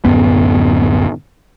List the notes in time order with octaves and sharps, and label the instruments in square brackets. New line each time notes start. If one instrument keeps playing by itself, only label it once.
[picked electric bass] D1 G#1 F#2 B3